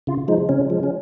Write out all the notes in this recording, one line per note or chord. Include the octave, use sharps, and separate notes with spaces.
C#3 F4
F3 G#3 D#4
C#3 C#4
F3 G#3
C#4